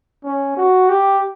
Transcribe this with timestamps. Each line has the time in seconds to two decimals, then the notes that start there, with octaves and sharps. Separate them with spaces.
0.24 C#4
0.57 F#4
0.89 G4